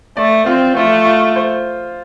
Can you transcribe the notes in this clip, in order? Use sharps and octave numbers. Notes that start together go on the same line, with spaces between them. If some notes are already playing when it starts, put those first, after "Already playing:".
A3 D5
C4 F4
A3 F4
F4
C5